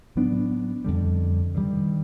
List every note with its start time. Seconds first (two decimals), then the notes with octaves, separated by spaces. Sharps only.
0.15 A2 F#3 B3 D4
0.84 F2 D3 G3
1.55 G2 D#3 G3